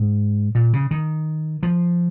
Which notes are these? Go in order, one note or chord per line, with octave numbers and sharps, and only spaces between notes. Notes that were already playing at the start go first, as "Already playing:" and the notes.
Already playing: G#2
A#2
C#3
D#3
F3